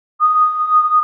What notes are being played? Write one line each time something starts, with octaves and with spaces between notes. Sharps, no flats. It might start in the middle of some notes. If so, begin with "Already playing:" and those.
D#6